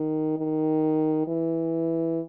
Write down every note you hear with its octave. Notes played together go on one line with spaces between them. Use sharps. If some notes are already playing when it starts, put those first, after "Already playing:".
Already playing: D#3
D#3
E3